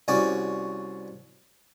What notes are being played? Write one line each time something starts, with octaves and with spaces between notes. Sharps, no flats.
C2 C#4 F#4 D5